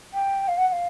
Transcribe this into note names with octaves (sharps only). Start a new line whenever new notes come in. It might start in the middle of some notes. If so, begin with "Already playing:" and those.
G5
F5
F#5
F#5
F5